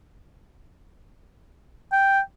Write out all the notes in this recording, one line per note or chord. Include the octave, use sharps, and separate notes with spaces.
G5